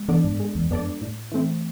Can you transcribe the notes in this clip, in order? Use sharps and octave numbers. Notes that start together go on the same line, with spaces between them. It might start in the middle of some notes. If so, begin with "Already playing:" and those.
Already playing: G#3
E3 B3 D4 A4 D5
G#2
G#3
E2
F2 B3 D4 A4 D5
A2
E3 A3 C4